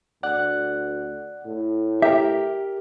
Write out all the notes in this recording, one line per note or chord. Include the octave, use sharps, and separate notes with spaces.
D2 D5 F#5 F#6
A2
G4 A#4 E5